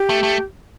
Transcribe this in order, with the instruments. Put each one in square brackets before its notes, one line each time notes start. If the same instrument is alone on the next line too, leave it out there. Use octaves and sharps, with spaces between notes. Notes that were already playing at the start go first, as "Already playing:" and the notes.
Already playing: [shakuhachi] G4
[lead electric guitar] A3
A3